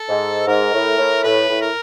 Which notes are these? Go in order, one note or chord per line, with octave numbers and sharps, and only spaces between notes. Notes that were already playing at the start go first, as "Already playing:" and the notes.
Already playing: A4
G#2
G#2 A#4
A2
A2
A2 B4
A2
A#4